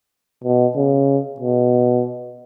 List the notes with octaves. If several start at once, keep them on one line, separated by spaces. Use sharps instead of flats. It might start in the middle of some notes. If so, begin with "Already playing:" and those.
B2
C#3
B2